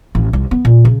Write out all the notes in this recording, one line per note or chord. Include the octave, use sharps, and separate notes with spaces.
A1
C2
B3
A#2
C#3